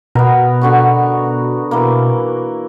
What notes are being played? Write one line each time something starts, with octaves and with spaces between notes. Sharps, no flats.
B2 B3 A#4
D3 F#4 C#6
E3 A#3